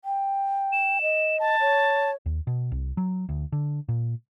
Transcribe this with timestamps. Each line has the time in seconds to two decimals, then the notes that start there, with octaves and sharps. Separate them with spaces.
0.05 G5
0.72 E7
1.02 D#5
1.40 A5
1.60 C#5
2.26 D#2
2.47 B2
2.72 C2
2.97 F#3
3.29 D2
3.52 D3
3.89 A#2